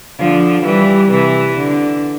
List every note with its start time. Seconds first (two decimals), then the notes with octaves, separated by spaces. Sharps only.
0.19 D3 F3
0.65 E3 G3
1.11 C3 E3
1.57 D3